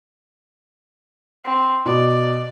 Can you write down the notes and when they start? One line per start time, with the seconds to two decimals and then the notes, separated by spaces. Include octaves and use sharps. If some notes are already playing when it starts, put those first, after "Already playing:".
1.45 C4
1.86 B2 D5